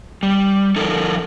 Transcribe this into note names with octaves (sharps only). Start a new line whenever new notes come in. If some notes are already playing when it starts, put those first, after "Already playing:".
G3
F3 D#4 A4 A#4